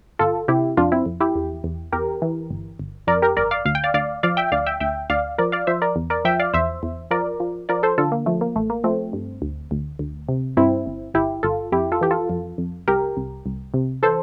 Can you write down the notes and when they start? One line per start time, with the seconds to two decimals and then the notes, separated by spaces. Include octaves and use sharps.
0.19 G1 F4 A4
0.48 C3 E4 G4
0.77 F2 D4 F4
0.92 C4 E4
1.06 F2
1.21 E4 G4
1.35 E2
1.64 E2
1.92 E2 G4 A#4
2.22 E3
2.51 G1
2.79 G1
3.07 F2 A#4 D5
3.22 G4 A#4
3.37 G1 A#4 D5
3.51 D5 F5
3.65 D2 F5
3.75 G5
3.84 D5 F5
3.94 D2 D5 F5
4.23 F3 D5 F5
4.37 E5 G5
4.52 D2 D5 F5
4.66 E5 G5
4.80 D2 E5 G5
5.10 D2 D5 F5
5.38 F3 A#4 D5
5.52 D5 F5
5.67 F3 C5 E5
5.82 A#4 D5
5.96 E2
6.10 A#4 D5
6.25 F3 E5 G5
6.40 D5 F5
6.54 E2 C5 E5
6.83 E2
7.11 F3 A#4 D5
7.40 F3
7.69 F3 A#4 D5
7.83 A4 C5
7.98 D3 F4 A4
8.12 A#3
8.26 F3 A3
8.41 A#3
8.56 A1 A3
8.70 A#3
8.84 F3 A3 C4
9.13 G2
9.42 D2
9.71 D2
9.99 D2
10.29 C3
10.57 G2 C4 E4
10.86 G1
11.14 G1 E4 G4
11.43 G1 F4 A4
11.72 F2 E4 G4
11.92 F4 A4
12.01 E3 G4
12.11 F4 A4
12.30 F2
12.58 F2
12.88 C2 G4 A#4
13.17 C2
13.46 C2
13.74 C3
14.03 E3 A4 C5